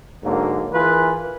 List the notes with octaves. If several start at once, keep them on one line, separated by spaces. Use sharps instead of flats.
G#2 D3 F#3 A#3
E3 F4 G#4 A#4 B4